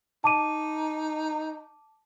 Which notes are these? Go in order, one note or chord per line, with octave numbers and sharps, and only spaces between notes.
D#4 A5 D6 D#7